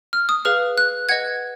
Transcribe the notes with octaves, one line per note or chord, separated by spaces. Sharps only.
F6
D#6
G#4 B4 F5 F6
F#6
B4 D#5 F#5 G#6